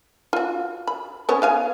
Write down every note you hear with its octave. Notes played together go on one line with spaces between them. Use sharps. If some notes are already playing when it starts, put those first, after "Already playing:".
F4 F#4
B5
B3 C#4 C#5
B3 F5 G#5